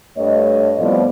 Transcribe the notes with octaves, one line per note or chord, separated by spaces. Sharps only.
G2 A3 C#5 D#5
F2 A2 F3 G3 B3 D5